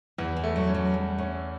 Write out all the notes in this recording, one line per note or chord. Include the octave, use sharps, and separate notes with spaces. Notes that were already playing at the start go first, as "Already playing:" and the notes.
E2 E3
E3
A3
F#3
C#4
F#3
G3 C#4
A3 C#4